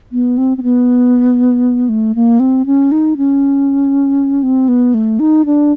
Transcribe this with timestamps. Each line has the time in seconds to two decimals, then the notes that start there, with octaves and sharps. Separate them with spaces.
0.12 B3
0.38 C4
0.57 C4
0.63 B3
1.89 A3
2.15 A#3
2.40 C4
2.66 C#4
2.92 D#4
3.17 C#4
4.43 C4
4.68 B3
4.94 A3
5.19 D#4
5.45 D4